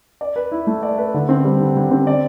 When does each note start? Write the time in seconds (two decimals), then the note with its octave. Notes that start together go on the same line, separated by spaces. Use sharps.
0.21 D5
0.36 B4
0.52 E4
0.67 A3
0.83 D5
0.98 B4
1.14 D3
1.29 C4
1.44 G3
1.60 D3
1.77 D3
1.91 C4
2.07 D5